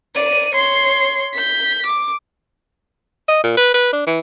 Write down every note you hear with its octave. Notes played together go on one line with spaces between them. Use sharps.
D5 D#7
C#5 C6
G6 B6
D6
D#5
A#2
B4
B4
D4
E3